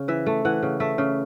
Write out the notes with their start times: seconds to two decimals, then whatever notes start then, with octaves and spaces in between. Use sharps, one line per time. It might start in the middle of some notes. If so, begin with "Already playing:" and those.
Already playing: C#3
0.08 E3 E5
0.26 A3
0.45 E3 F#5
0.63 C#3
0.80 A3 E5
0.98 C#3